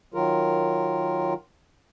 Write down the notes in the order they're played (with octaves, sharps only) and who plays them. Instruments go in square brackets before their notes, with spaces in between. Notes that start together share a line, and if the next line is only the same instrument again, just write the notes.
[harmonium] D#3 F#3 F4 A#4